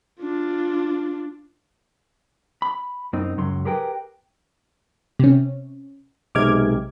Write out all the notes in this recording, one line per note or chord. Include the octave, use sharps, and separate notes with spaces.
D4 F4
B5
F#2 C4 D#4
C#2 F#2 F#3 C6
G4 G#4 A#4 B4 G5
C3 C#4
B1 C3 G#3 D6 F6 G#6